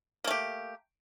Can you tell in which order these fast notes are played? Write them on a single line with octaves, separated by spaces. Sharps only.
A#3 A3 G4